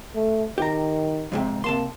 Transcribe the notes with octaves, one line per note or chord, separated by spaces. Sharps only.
A3
D#3 G4 A#5
F2 G#2 C3
C3 A#3 A5 C6